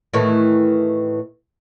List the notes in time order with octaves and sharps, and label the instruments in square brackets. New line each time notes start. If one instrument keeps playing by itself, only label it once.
[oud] A2 D#3 E3